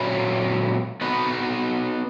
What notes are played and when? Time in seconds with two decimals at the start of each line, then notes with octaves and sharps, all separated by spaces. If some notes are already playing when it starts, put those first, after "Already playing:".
Already playing: A#2 F#3 C#4 E4 B4
1.01 B3 D#4 F#4 B4